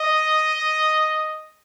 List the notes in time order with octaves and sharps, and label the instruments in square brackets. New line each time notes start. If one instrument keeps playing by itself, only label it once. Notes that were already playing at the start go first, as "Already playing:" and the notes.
Already playing: [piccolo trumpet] D#5